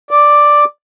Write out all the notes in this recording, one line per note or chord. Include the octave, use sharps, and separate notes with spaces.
D5